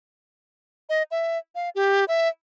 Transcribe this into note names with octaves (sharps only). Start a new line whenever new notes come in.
D#5
E5
F5
G4
E5